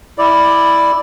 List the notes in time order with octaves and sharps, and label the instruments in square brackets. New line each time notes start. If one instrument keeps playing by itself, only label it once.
[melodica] E4 D5